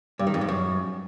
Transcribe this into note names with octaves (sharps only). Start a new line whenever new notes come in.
G2
D#3
F2
G#2
F#2